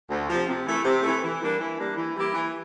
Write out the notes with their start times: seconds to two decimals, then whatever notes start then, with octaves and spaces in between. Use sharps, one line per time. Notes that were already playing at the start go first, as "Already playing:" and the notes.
0.09 D2
0.29 C3 F3
0.48 C3
0.66 E3 A3
0.85 C3
1.03 E3 A3
1.23 E3
1.40 G3 A#3 D4
1.60 E3
1.79 G3 A#3 D4
1.97 E3
2.16 G3 A#3 E4 G4
2.34 E3